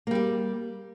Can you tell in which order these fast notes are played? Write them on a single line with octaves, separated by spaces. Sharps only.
A#3 G3 G4